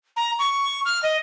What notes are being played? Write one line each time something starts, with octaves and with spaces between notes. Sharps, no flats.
A#5
C#6
F6
D#5